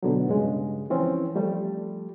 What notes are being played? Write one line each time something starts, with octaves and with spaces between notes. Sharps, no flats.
B2 D3 F#3
G2 C#3 G#3
E3 F3 C4 C#4
F3 G3 A3